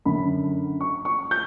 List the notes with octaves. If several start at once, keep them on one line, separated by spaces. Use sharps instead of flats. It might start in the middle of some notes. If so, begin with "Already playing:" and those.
F#2 D3 B5
C#6
C#6
G6